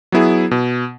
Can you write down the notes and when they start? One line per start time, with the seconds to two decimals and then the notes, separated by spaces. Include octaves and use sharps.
0.12 F#3 B3 E4 G#4
0.51 B2